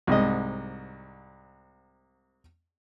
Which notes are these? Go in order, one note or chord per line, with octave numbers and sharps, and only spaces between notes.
C2 G#2 D#5